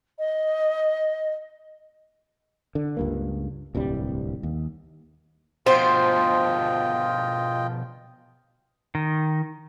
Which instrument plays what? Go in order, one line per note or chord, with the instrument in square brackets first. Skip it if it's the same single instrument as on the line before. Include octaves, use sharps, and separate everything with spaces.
[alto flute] D#5
[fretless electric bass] D3
C#2 G2 A#3
D1 C2 G2 G3
D#2
[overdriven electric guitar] B2 F3 [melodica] F4 D#5 G5 [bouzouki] C5
[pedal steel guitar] D#3